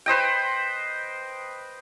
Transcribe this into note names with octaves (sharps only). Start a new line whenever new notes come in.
B4 C5 D#5 G5